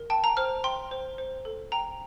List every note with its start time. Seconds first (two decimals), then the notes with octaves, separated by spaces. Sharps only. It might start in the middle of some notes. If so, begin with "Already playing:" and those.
Already playing: A#4
0.10 G5 A5
0.24 A#5
0.37 C5 F6
0.64 G5 C6
0.91 C5
1.18 C5
1.45 A4
1.72 G5 A#5